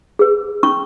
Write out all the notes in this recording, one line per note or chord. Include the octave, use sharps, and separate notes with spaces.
G#4 B4
C#4 C#6